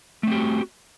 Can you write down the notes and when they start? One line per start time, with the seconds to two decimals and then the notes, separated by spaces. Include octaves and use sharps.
0.23 A3
0.27 C4
0.31 G4
0.35 F#4